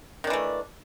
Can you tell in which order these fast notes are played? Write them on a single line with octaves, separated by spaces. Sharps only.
D#3 D4 E3 A3